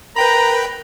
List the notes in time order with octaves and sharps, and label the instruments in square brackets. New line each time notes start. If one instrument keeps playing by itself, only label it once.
[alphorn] A#4 [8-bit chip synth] B4 G5 B5 [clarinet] A#5